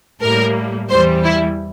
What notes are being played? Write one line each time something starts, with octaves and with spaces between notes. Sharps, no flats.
A2 G3 A#3 A#4
E2 E3 G3 C5
E4